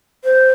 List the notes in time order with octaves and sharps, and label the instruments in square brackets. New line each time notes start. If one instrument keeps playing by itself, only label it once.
[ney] C5